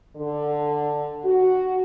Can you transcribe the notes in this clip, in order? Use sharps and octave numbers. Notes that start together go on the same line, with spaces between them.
D3
F#4